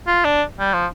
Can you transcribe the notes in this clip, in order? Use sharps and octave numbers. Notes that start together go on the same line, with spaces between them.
F4
D4
G3
F3